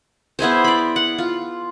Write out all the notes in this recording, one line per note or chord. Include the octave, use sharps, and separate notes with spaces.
B3 E4 G#4 C5
D5 B5
F#5
F4